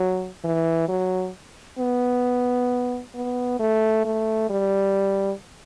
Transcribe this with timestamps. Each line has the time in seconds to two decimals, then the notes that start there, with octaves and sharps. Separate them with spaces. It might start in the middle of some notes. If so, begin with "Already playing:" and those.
Already playing: F#3
0.44 E3
0.89 F#3
1.79 B3
3.15 B3
3.60 A3
4.05 A3
4.50 G3